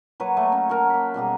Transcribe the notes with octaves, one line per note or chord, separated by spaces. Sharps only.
F#3 A#3 B4 C#5
A3 A#3 D#5 A5
C#4
F#4 A#4 A5
A#3 B5
B2 G3 A#3 G#4